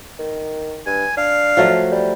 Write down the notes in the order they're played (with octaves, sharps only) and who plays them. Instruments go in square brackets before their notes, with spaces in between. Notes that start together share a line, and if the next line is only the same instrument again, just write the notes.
[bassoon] D#3
[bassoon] G2 [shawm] G#5
[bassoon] D4 [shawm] F5
[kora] F3 F#3 A3
[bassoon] G3